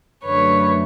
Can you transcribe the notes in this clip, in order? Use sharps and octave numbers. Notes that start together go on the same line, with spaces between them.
F#2 D3 F#3 A3 B4 C#5